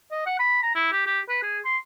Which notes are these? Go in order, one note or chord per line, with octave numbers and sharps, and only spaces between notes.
D#5
F#5
B5
A#5
E4
G4
G4
B4
G#4
C6